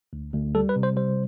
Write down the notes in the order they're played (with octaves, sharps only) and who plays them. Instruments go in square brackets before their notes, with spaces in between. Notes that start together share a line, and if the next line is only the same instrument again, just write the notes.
[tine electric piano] D2
D2
G3 A4
B4
C3
C5
G3 C5